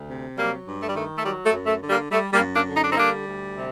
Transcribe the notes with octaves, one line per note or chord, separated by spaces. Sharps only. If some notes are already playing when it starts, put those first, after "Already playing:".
Already playing: D2
C3
F#3 G3 A#3
G2
A3
G3
D#3 A3
A3
F#3 G3
A3
F#2
A3
D3
G3 A#3
G3 A3
G3 A#3
F#2
A#3 D4
D3
D#4
D4
C4 D#4
G3 A#3 D4
D2
C3